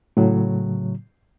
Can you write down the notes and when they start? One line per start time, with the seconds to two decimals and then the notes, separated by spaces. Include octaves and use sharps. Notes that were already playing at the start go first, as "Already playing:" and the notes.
0.17 A2 C#3 F#3